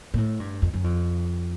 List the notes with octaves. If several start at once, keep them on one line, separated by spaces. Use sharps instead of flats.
A#2
A2
G2
F2
F#2
F2